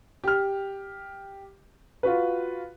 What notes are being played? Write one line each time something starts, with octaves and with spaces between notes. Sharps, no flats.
G4 F6
F4 F#4 B4